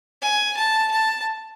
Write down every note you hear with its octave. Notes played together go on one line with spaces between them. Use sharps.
G#5
A5
A5